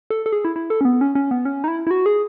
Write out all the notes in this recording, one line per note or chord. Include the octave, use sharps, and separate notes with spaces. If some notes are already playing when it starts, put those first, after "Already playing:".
A4
A4
G#4
E4
E4
A4
C#4
B3
C#4
C#4
B3
C#4
D#4
E4
E4
F#4
G#4